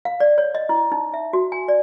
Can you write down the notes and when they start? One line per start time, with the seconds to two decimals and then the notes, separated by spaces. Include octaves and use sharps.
0.05 F5
0.20 D5
0.38 C#5
0.55 D#5
0.69 E4
0.92 D#4
1.14 E5
1.33 F#4
1.52 G#5
1.68 D5